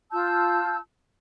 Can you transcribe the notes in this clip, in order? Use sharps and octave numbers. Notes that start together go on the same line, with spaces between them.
F4 A5 E6 G6